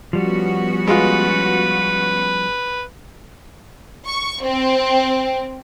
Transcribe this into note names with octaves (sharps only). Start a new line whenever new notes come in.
F3 G3 B3 C#4 F#4
G#3 F4 B4
C#6
C4